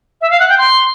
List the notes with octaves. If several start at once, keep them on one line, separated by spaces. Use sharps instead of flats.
E5
F5
F#5
G5
C6